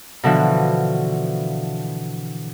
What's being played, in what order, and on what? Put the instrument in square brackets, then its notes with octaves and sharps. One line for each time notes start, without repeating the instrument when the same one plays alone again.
[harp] B2 D3 E3 F3